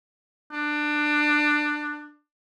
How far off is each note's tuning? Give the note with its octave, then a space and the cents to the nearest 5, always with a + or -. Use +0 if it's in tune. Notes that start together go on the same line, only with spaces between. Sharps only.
D4 +20